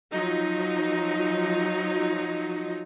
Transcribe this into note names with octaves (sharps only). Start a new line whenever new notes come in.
F3 F#3 D#4